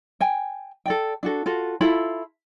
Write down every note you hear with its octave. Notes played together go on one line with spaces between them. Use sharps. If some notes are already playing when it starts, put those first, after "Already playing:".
G5 G#5
A4 D5 G5
D4 F#4 A4
F4 F#4 A4
E4 F4 A4 B5